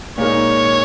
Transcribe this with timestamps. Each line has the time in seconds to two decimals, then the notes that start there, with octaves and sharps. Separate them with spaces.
0.18 A#2 G#3 D#4 A#4 C#5